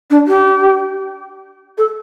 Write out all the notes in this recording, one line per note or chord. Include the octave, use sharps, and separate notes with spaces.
D4
G4
A4